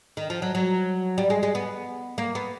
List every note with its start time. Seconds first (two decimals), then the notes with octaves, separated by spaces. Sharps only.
0.17 D#3
0.30 F3
0.42 F#3
0.55 F#3
1.18 G3
1.30 G#3
1.43 G#3
1.55 B3
2.18 A#3
2.35 B3